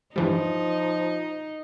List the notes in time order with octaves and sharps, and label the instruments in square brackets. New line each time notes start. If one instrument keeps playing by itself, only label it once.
[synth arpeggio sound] G2 E3 G3 [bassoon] F3 [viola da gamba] D#4